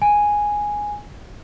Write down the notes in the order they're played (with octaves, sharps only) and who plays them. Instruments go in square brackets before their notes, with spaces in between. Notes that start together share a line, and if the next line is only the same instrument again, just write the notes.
[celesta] G#5